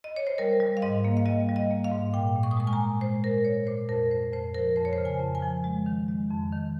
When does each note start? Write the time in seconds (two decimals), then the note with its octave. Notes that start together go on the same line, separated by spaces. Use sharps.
0.04 D#5
0.16 C#5
0.27 C5
0.38 G3 A#4
0.60 G3
0.77 F5
0.82 G#2 D#5
1.05 A#3
1.17 F5
1.26 G3 D#5
1.49 G3
1.56 D#5
1.71 A#3
1.84 F5
1.91 G#2
2.13 A#2 G5
2.35 A#2
2.43 C#6
2.51 D#6
2.57 G#3 C#6
2.67 G#5
2.73 A#5
2.79 A#2
3.01 G#3 C5
3.24 G#3 A#4
3.45 A#2 C#5
3.67 A#2 C5
3.89 F2 A#4
4.11 F2 C5
4.33 F2 C5
4.54 F3 A#4
4.76 F2 C5
4.85 C#5
4.93 C5
4.98 C#3
5.05 G#5
5.20 F2
5.35 G#5
5.43 F3
5.64 G#3
5.86 D#3
6.08 G#3
6.30 F2
6.52 D#3